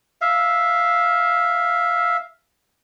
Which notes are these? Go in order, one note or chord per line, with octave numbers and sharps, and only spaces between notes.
E5 F5